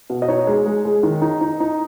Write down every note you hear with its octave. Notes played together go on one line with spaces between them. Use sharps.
B2
D#5
D#4 C#5
G#3
G#3
G#3
D#3
D#4
D#4
D#4